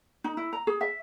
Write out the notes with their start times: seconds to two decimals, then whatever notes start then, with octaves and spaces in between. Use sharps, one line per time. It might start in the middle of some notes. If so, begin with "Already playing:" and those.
0.24 D#4
0.37 E4
0.53 A#5
0.67 G#4
0.81 E5